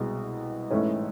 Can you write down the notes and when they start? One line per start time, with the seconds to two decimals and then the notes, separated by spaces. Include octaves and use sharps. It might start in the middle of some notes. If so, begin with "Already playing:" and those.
Already playing: C2 B2 G#3
0.71 A1 G#2 E3 A3 C#4